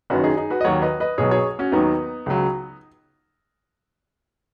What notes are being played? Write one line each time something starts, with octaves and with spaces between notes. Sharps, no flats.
F#1 F#2 D#3 F#4 B4
D#4 G#4
D#4 G#4
F#4 B4
D#5
D#2 D#3 F#3 C#5 F#5
B4 D#5
B4 D#5
B1 B2 F#3 G#4 C#5
G#4 C#5
C#4 F#4
D#2 D#3 F#3 B3 D#4
C#2 C#3 F#3